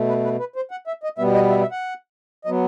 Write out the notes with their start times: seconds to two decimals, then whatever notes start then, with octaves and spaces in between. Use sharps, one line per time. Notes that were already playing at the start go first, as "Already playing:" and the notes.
Already playing: B2 A3
0.08 B4
0.24 B4
0.39 B4
0.56 C5
0.71 F#5
0.87 E5
1.03 D#5
1.18 B2 G3 B3 E5
1.35 D#5
1.50 E5
1.61 E5
1.72 F#5
2.45 F#3 B3 D#5